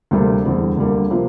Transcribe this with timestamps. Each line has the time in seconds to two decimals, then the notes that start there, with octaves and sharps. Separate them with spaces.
0.11 D2 C3 G3 A#3
0.45 E2 D3 G3 C4
0.77 D2 D3 G3 A#3
1.10 C3 F3 A#3 F4